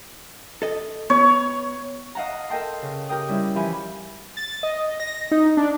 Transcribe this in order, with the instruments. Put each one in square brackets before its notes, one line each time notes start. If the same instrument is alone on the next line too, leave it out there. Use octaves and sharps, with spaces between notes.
[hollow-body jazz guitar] A4 D#5
[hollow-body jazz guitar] B3 [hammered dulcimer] C#5
[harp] D#5 F5 F#5 A5 A#5
A4 A#4 D#5 G5 A5 C6
C#3
G4 A#4 G5 D#6
G3 C#4 E4
E3 F3 G4 G#5 B5
[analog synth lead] A6
D#5
A#6
D#4
D4